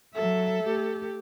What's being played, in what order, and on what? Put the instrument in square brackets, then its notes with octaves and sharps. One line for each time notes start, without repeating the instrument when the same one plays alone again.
[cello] F#3 E5 [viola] A4
[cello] A3 G4